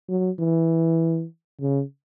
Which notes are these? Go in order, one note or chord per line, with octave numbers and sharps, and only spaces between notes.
F#3
E3
C#3